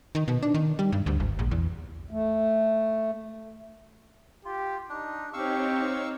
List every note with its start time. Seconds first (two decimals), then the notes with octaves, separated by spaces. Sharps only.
0.15 D#3
0.28 B2
0.43 D4
0.54 D#3
0.79 G3
0.92 G2
1.06 D2
1.20 G#1
1.39 A#1
1.51 E2
2.11 A3
4.45 F4 G4
4.90 D4 D#4
5.34 C4 D#4 G4 C#5 F5 C#6 E6